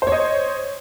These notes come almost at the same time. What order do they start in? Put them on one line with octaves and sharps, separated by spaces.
C5 C#5 D#5